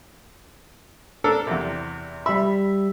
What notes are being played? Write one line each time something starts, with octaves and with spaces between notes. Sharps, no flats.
D4 A4 A#4
E2 C3
G3 E5 B5